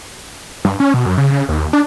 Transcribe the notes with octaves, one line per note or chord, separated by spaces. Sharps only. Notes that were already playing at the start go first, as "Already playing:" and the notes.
G2
C#4
B2
F#2
C#3
C#3
D#2
D4